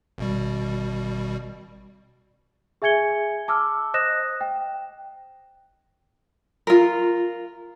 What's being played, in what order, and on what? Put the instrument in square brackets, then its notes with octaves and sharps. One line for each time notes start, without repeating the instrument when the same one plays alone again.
[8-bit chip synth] G#1 B2 G3
[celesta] G#4 E5 G#5 G#6 C#7 G7
A5 D6 E6 F6
C5 D#5 D#6 F#6 A#6 E7
G5
[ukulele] F4 A#4